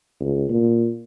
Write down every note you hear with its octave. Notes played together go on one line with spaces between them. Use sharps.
C#2
A#2